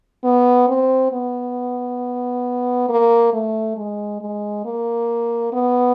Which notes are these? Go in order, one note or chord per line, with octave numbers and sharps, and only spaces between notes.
B3
C4
B3
A#3
A3
G#3
G#3
A#3
B3